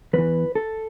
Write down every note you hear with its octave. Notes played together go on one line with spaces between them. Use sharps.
E2 E3 B4
A4